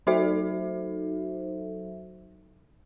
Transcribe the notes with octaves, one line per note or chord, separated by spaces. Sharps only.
F#3 D#4 F#4 A4 C5 E5